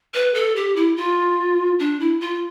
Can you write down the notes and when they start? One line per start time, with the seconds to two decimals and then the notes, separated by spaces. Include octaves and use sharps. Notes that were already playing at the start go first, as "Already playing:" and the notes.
0.14 B4
0.34 A4
0.56 G4
0.76 E4
0.96 F4
1.79 D4
2.00 E4
2.20 F4